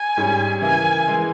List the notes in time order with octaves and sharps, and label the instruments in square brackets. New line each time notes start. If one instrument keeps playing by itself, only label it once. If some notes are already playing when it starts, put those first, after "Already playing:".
Already playing: [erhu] G#5
[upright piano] G#2 G3 C#4
[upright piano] C#3 E3 A#3 E4 [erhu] G#5
[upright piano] E3 G#3